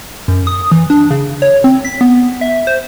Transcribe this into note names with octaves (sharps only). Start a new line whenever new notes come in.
F#2
D#6
E3
D4
C#3
C#5
C4
B6
B3
E5
C5